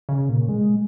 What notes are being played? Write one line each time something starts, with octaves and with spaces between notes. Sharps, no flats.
C#3
A#2
G#3